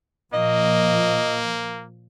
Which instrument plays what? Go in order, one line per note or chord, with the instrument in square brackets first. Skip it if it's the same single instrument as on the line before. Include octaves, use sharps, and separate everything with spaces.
[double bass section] A#2 F3 [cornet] A#3 [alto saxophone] D#5